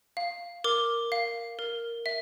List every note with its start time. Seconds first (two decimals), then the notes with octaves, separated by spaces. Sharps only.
0.17 F5
0.64 A#4 D6
1.12 F5
1.59 A#4
2.06 E5